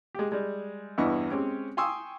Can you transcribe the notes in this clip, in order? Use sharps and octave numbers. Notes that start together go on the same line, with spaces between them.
G#3 G4
G3 G#3
E2 G2 B3 E4 D#5 C#6
G#3 C4 C#4 G4
G5 G#5 C6 C#6 D#6 E6